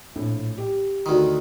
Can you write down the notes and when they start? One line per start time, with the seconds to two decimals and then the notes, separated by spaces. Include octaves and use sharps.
0.15 A#1 A2
0.57 G4
1.06 D2 D#3